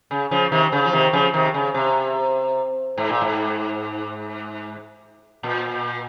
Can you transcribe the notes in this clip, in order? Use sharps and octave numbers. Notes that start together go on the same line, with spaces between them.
C#3
C#3 F3
C3 D#3
C#3
F3
C3 D#3
C#3 F3
C3 D#3
C#3
C3
G#2
A#2
G#2
A#2